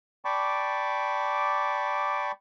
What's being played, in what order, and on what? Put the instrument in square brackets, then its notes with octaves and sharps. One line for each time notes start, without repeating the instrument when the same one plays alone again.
[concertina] D5 G5 A5 B5 C#6 D6